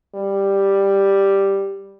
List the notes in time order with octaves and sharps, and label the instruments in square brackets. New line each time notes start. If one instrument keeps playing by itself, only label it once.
[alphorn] G3